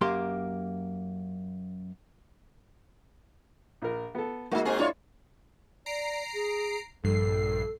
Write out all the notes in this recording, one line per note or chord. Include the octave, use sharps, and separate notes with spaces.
F#2 A#3 G4 C6
A#1 A#4
B3 A4
G#3 A#3 D#4 F4 F#4
G#2 C4 G#4
D4 E4 F4 C#5
D5 A#5 C7 D7
G#4
A#1 G2 A4 C7